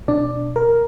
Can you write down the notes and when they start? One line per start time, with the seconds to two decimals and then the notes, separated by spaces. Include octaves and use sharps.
0.08 B2 D4 D5
0.56 A#4